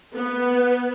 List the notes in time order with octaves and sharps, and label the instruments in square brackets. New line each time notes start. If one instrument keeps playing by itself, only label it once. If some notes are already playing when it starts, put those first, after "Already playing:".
[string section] B3 [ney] B4